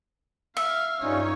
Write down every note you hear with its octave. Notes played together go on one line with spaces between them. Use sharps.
E5 F5 F6
G2 G3 C#4 D#4 F4 C#5